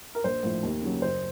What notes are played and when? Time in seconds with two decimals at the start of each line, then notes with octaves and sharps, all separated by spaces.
0.15 A#4
0.24 A#1 C5
0.43 A2 F3
0.63 D#2
0.82 C#3 F#3
1.02 F#1 C5